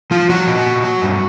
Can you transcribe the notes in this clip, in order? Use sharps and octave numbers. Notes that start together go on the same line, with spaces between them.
F3 F4
F3 F#4
A#2
A#2
F#3
G2